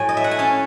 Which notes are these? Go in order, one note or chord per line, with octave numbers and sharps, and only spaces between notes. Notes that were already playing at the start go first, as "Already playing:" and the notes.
Already playing: A2 F#3 G#5
D#5
E5
F#5
G#5
C#4 A5